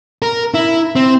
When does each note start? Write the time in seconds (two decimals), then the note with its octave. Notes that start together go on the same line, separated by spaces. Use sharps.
0.22 A#4
0.54 E4
0.96 C4